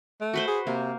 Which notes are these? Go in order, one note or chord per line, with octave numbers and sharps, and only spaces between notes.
A3
F#4 B4 C5
G#4
C3 A#3